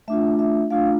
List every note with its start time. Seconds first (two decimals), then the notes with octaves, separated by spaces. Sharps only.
0.08 A3 D4 F4 E5
0.39 E5
0.70 A3 D4 F4 F5